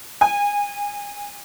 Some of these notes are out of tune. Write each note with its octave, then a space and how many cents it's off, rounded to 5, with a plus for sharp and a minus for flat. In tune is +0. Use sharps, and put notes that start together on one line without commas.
G#5 -25